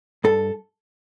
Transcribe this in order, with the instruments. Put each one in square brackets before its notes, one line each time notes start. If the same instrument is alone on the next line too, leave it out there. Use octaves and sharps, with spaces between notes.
[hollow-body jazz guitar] G2 A4